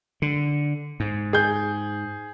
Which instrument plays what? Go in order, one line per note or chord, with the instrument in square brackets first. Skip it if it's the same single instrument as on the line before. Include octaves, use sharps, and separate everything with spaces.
[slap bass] D3
G#2
[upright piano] G#4 G6